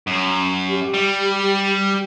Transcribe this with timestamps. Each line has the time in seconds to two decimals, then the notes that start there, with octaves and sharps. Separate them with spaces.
0.07 F#2
0.69 G4
0.94 G3